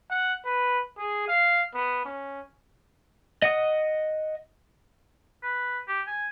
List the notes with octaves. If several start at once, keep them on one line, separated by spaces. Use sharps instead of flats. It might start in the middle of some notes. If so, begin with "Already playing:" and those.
F#5
B4
G#4
F5
B3
C#4
D#5 F#5 D#6
B4
G4
G#5